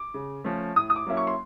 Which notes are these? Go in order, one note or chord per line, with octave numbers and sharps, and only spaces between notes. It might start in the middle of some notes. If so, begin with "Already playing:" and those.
Already playing: D6
C#3
F3 A3 C#4
A2 D#6
D#6
D6
F#3 A#3 C#4 E4
C#6
C6